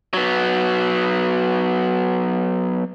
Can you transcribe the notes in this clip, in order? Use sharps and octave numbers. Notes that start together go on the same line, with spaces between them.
F#3 B3